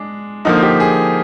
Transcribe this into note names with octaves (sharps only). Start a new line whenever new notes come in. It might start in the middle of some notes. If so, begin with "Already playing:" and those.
Already playing: G#3 D4
D3 F3 A#3 D#4
G4
G#4